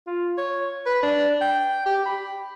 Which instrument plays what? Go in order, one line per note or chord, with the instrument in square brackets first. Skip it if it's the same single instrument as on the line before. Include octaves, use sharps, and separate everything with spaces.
[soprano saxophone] F4
C#5
B4
D4
G5
G4
B5